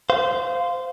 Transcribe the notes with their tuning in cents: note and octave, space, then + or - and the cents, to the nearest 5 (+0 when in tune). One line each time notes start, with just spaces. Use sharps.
C5 -20 F5 +0